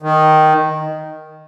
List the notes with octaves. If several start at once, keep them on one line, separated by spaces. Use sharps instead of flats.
D#3